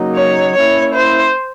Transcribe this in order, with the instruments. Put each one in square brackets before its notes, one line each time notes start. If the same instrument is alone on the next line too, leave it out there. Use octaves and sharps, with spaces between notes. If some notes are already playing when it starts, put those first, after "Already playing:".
Already playing: [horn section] C#3 F#3 A#3 D#4 F#4
[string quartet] C#5
[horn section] A#3 C#4 E4 [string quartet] C#5
[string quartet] C5